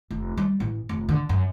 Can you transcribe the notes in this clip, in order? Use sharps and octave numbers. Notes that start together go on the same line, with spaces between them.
F1
G3
A1
F1
D3
F#2